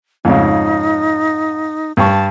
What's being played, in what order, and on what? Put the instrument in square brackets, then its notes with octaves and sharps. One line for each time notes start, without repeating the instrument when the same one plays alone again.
[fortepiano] F2 G#2 C#3 [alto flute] D#4
[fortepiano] G2 C#6 [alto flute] A5